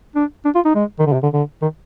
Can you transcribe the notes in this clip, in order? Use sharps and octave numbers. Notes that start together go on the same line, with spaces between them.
D4
D4
F4
D#4
G#3
D#3
D3
C3
D3
D3
D#3